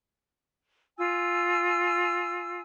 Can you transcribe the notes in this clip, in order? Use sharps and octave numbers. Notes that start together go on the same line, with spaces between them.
F4 G#5 E6